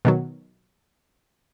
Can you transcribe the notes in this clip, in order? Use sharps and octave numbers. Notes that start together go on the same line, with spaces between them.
B2 D#3 F#3